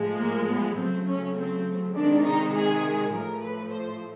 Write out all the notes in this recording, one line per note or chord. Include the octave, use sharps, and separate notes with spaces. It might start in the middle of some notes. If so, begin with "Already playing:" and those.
Already playing: A2 F3 G#3
A#3
B3
C#3 F#3 A3 C4
C#4
C4
C3 D#3 G#3 D4
D#4
G#4
A2 F3 A3 A#4
B4
C5